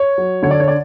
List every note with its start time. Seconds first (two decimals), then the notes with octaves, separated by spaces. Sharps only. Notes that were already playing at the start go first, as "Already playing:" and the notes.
Already playing: C#5
0.18 F#3
0.43 D3 C#5
0.51 D5
0.60 C#5
0.68 D5